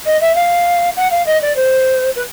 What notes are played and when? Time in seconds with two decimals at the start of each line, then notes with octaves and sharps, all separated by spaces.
0.06 D#5
0.21 E5
0.35 F5
0.96 F#5
1.11 F5
1.26 D#5
1.42 D5
1.56 C5
2.16 B4